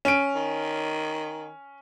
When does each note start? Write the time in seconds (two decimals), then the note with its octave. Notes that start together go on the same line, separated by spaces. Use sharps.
0.05 C#4 D7
0.35 D#3